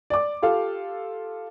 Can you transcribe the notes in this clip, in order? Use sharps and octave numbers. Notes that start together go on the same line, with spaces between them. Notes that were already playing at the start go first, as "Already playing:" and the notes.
D5 D6
F4 G4 A4 F5